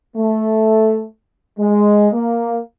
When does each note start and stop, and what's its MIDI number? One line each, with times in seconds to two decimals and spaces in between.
0.16 1.05 57
1.58 2.08 56
2.12 2.60 58